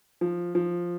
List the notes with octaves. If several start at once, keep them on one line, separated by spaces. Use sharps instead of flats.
F3
F3